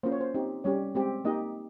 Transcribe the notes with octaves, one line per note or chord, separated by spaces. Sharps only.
A#3 C#4 F4 C5
C#5
C5
C4 D#4 G4
G3 C#4 G4 C#5
G#3 C4 G4
A#3 D#4 G4 D#5